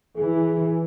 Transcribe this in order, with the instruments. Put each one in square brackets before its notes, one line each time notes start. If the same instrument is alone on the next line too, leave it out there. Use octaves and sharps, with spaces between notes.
[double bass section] E3 [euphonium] G#4